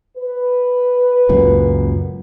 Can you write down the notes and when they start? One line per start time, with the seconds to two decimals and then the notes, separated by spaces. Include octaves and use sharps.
0.17 B4
1.29 C#2 F#2 A#2